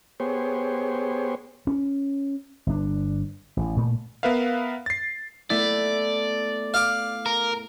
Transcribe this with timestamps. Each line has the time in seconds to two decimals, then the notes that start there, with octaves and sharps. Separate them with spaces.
0.20 B3 G4 G#4 C5 C#5
1.67 C#4
2.67 G1 D4
3.57 A1
3.77 A#2 A3
4.23 B3 A#4 B4 E5 F5
4.86 A6 C7
5.50 A3 B3 E4 D5
6.74 F5 D6
7.26 A#4